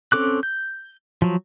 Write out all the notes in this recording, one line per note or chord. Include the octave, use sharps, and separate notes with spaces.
C4 C#4 A4 D6 F#6
G6
F3 F#3